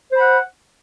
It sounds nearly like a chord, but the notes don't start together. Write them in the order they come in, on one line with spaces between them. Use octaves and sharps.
C5 B5 F#5